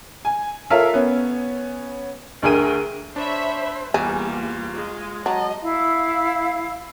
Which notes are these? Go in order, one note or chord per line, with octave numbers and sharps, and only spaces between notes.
G#5
F4 A4 A#4 C#5 E5 F5
B3 C#4
D2 D3 G#4 A#4 G5 D#7
D4 C5 C#5 E5 B5
E2 G3 A#3 F4 G#4
G#3
F#3 D#5 A5 A#5
E4 F5